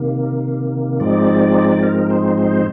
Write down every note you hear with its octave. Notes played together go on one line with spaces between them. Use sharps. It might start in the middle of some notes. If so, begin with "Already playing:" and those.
Already playing: C3 D#3 A#3
G#2 F3 G#3 C4 D#4 D5
A#4
C5
C5